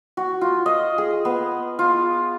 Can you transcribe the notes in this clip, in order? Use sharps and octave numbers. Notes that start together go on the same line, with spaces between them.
F#4
F4
D#5
G#4
B3
F4